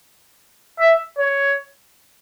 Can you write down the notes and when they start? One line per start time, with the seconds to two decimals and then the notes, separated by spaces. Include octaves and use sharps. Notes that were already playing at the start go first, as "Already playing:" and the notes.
0.79 E5
1.18 C#5